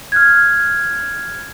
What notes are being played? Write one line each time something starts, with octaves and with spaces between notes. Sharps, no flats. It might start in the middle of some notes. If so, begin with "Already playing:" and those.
F6 F#6 G#6